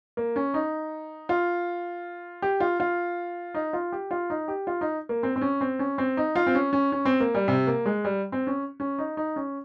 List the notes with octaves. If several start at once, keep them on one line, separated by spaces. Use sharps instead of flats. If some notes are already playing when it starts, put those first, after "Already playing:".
A#3
C#4
D#4
F4
G4
F4
F4
D#4
F4
G4
F4
D#4
G4
F4
D#4
A#3
C4
C4
C#4
C4
C#4
C4
D#4
F4
C4
C#4
C#4
C#4
C4
A#3
G3
C3
A#3
G#3
G3
C4
C#4
C#4
D#4
D#4
C#4